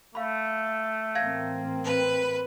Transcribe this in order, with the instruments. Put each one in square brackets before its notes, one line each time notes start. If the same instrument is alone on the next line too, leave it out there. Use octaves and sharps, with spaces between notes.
[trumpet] A3 [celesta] F5 B5
[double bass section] A1 A#3 C4 [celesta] F5 G#6 A#6
[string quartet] B4